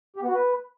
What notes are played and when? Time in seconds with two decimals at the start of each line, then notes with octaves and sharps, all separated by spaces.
0.16 G4
0.22 B3
0.28 F#4
0.34 B4